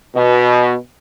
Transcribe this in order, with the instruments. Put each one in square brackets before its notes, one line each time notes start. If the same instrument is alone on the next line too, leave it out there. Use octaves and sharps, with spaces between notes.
[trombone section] B2